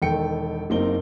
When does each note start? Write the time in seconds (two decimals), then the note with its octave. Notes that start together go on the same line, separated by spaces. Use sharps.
0.02 E1 D#3 A4 G5 C#7
0.70 F#1 F#2 A#3 C4 D#4 G7